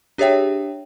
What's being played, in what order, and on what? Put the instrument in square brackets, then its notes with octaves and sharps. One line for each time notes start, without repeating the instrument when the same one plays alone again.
[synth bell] D4 G4 G#4 C#5 E5 G5